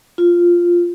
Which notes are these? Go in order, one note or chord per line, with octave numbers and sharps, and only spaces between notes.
F4